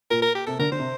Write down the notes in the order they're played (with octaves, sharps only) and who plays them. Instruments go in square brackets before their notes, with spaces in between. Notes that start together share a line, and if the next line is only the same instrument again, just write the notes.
[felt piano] A#2 [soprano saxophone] A#4
[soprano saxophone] A#4
G4
[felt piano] C3 [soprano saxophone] A4
[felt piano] D3 [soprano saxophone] A#4
[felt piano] D3 [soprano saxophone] C5
[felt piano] C3